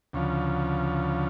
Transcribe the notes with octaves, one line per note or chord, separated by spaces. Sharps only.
D2 C#3 F3